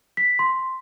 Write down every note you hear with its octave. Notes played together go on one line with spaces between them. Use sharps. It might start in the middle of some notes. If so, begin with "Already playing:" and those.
B6
C6